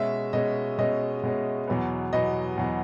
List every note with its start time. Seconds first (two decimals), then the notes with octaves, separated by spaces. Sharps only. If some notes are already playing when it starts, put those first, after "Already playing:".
Already playing: B2 G#3 C#4 E5
0.33 B2 G#3 C#4 D#5
0.78 B2 G#3 C#4 D#5
1.23 B2 G#3 C#4
1.67 E2 B2 F#3 B3
2.13 E2 B2 F#3 B3 D#5
2.57 E2 B2 F#3 B3